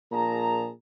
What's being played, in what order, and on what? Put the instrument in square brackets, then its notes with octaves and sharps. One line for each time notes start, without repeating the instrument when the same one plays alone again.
[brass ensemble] A#1 A#2 G#4 A5 A#5